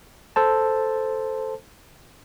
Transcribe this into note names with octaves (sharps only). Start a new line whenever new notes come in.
A4 C5 A5